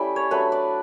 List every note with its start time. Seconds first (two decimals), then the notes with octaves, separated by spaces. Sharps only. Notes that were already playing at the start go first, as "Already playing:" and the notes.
Already playing: G3 A3 C#4 E4
0.16 C#5
0.31 F#3 A3 D4 B4
0.52 D5